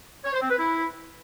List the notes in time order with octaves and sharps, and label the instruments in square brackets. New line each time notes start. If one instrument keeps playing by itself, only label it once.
[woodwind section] C#5
C5
C4
B4
E4